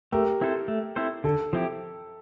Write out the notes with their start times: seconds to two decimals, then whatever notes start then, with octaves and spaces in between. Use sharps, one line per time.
0.12 A3 G4 A#4
0.41 C4 E4 A4 C5
0.68 A3
0.96 C4 E4 A4 C5
1.24 D3 A4
1.53 F3 C4 E4 G4